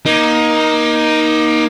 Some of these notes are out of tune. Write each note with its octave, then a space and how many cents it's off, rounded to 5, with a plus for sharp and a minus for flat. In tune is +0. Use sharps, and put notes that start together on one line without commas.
A#3 +30 D#4 +5